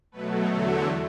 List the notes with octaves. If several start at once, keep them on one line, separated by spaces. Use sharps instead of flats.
B2 F#3 A3 B4
E2 D3 F#3 A3 A4